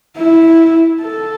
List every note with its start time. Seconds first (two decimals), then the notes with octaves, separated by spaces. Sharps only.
0.16 E4
1.01 A4